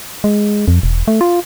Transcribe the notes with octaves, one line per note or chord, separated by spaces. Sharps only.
G#3
F2
E1
A3
F4